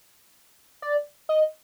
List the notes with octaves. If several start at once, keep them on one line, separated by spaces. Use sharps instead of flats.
D5
D#5